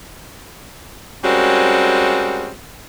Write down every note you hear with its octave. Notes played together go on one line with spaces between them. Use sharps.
G3 G#3 A#3 C4 C#4 F#4